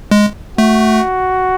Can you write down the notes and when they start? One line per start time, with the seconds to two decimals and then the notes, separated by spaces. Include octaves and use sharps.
0.11 G#3
0.57 A3 F#4